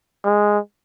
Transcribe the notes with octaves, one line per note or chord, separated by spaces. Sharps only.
G#3